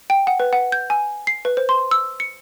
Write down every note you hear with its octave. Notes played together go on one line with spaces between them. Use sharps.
G5
F#5
B4
F#5
G6
G#5
C7
B4
C5
C6
E6
C#7